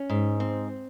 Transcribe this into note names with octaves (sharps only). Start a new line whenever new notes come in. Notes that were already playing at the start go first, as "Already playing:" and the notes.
Already playing: C#4
G#2
C4